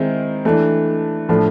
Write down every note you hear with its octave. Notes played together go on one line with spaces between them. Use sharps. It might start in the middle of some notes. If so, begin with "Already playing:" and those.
Already playing: D#3 G#3 C4 E4
E3 A3 D4
A2 F3 A3 D4